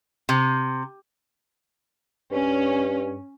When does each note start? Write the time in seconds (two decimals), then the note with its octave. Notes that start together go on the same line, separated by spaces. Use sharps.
0.29 C3
2.32 G2 C#4